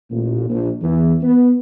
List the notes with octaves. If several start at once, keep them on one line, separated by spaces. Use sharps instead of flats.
A1 A#2
A#1
E2 E3
B3